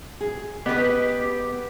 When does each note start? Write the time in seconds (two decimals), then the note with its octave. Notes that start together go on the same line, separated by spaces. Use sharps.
0.21 G#4
0.66 B3 G4 B4 D#5